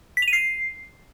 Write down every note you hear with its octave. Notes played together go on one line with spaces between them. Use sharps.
B6
F7
D#7
C7